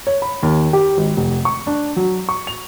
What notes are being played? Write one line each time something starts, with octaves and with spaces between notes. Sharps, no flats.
C#5
B5
D#2
G4
G#1
F1
C#6
D4
F#3
C#6
F7